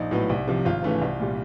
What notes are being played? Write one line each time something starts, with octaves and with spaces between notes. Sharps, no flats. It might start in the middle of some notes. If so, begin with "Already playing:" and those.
Already playing: A#1 D#4
A2 F#3 B3
C2
C3 F3
G#1 F4
G#2 E3 A3 C#4
C2
A#2 G3